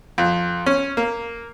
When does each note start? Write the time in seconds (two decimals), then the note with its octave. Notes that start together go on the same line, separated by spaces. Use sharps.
0.18 F2
0.66 C#4
0.97 A#3